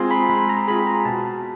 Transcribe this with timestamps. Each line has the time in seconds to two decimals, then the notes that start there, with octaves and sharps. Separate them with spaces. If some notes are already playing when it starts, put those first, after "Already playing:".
Already playing: G#3 C4 F4 G#4 G#5 A#5 C6
0.11 B5
0.30 G#3 B5
0.49 A#5
0.68 C4 F4 G#4 B5
0.86 A#5
1.05 B2 A5